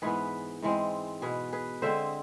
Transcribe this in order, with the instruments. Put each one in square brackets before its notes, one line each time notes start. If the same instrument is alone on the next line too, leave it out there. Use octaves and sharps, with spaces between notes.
[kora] G#2 E3 B3 G#4 B4
G#2 E3 G#3 C4
B2 B3 G#4 B4
G#4 B4
D3 G#3 C4 C5 E5